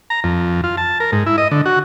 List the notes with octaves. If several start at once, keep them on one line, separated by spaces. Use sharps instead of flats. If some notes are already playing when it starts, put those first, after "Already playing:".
A#5
F2
F4
A5
A#4
G#2
E4
D#5
D3
F#4